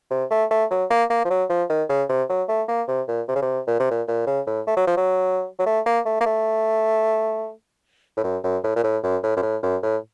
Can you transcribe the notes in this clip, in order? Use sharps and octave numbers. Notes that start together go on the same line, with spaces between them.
C3
A3
A3
F#3
A#3
A#3
F3
F#3
F3
D#3
C#3
C3
F#3
A3
A#3
C3
A#2
C3
C#3
C3
A#2
C3
A#2
A#2
C#3
A2
A3
F#3
F3
F#3
F#3
A3
A#3
A3
A#3
A3
A2
F#2
F#2
A2
A#2
A2
F#2
A2
F#2
A2
F#2
A2